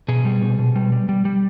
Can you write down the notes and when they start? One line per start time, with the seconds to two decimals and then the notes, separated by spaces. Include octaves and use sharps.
0.08 B2 G#4
0.25 G3
0.42 B2
0.59 B2
0.76 G3
0.92 G3
1.09 G3
1.25 G3